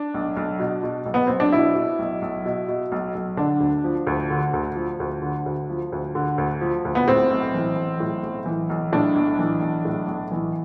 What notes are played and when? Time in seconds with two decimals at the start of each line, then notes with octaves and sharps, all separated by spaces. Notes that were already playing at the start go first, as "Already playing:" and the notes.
Already playing: D4
0.14 B1
0.37 B1
0.59 B2
0.83 B2
1.06 B1
1.14 B3
1.27 B1 C4
1.40 D4
1.52 B2 E4
1.75 B2
1.99 B1
2.22 B1
2.45 B2
2.68 B2
2.92 B1
3.15 B1
3.37 D3 D4
3.60 D2
3.84 F3
4.07 D2
4.30 D3
4.53 D2
4.76 F3
5.00 D2
5.22 D3
5.46 D2
5.69 F3
5.92 D2
6.15 D3
6.38 D2
6.61 F3
6.85 D2
6.95 B3
7.07 A2 C4
7.31 B1
7.54 E3
7.76 B1
8.00 A2
8.23 B1
8.46 E3
8.70 B1
8.92 A2 D4
9.16 B1
9.39 E3
9.62 B1
9.85 A2
10.07 B1
10.31 E3